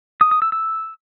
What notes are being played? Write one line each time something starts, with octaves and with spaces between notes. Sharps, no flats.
D#6
D#6
E6
E6